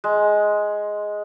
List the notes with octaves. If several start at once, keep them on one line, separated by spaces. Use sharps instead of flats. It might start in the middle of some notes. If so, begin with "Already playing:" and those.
G#3